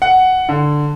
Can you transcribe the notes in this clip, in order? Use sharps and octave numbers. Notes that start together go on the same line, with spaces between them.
F#5
D3